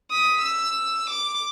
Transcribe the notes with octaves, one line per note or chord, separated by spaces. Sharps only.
D#6 B6
E6
D6